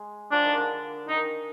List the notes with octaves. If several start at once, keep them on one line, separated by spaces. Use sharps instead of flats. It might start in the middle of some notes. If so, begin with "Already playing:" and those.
Already playing: G#3
F3 D4
D#3
D3
D#3 D#4